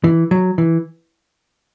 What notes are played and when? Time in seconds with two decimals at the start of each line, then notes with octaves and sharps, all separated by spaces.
0.04 E3
0.31 F#3
0.58 E3